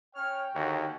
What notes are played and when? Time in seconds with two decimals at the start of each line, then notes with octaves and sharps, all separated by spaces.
0.15 C#4 C#5 G5 F6
0.55 D#2 D3 D4 D#4 F#4